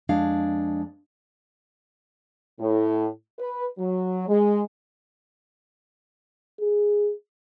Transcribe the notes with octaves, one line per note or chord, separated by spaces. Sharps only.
F2 G#3 D4 F5
A2
B4
F#3
G#3
G#4